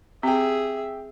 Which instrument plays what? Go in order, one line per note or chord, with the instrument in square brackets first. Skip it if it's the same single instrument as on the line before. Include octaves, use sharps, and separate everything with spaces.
[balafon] C4 [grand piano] G4 G5 [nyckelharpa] G#4 E5